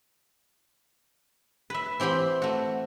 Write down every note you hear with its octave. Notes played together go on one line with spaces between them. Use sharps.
B4 E5
E3 C4 G4 B5 C6
A3 F#4